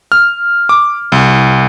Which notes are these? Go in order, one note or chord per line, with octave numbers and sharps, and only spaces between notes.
F6
D6
C2